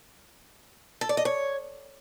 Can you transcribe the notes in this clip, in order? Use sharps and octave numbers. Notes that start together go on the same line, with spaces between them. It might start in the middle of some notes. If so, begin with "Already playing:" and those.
A4
D5
D#5
C#5